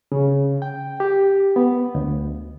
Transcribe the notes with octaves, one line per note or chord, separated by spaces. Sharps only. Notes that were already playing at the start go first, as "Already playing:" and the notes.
C#3
G5
G4
B3
D2